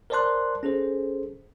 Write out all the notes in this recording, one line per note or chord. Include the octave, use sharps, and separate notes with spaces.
A#4 C5 D5 A5 C6 F#6
C#4 G#4 A4 C5